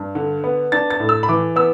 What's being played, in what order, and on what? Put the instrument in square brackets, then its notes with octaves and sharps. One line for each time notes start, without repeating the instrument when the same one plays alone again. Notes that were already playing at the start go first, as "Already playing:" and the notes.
Already playing: [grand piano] G2
D3
B3
D4 A6
A6
A2
E6
B5
E3 D6
B3 E6